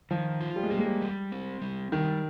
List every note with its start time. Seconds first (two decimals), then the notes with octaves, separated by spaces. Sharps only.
0.11 D#3 F3
0.41 F4
0.56 G3
0.63 G#3
0.70 G3 A#3
0.78 G#3
0.85 G3
1.01 G3
1.32 C4
1.61 G3
1.92 D#3 G3